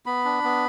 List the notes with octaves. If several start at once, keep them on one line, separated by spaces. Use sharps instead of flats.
B3 B5
D4
B3